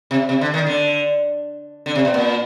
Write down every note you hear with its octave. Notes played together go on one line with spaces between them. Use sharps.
C3
C3
D3
D#3
D3
D3
C3
B2
A#2